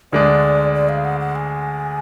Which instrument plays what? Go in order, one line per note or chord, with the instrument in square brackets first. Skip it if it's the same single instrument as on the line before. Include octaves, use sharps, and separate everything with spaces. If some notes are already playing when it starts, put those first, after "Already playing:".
[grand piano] D2 D3 G#3 D4 [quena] D5
[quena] D5
F5
F#5
F#5
G#5